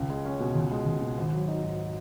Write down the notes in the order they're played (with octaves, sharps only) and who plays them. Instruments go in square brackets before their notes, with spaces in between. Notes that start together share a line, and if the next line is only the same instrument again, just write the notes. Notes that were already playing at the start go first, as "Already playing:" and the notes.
Already playing: [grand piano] C#2
G#3
C#4
B2
C#2
G#3
C#2
B2
G#1
F#3
D#4
G#2